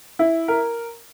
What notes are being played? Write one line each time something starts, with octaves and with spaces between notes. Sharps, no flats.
E4
A#4